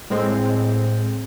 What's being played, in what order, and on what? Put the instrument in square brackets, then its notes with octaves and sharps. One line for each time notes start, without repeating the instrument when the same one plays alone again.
[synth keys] A2 G#3 C4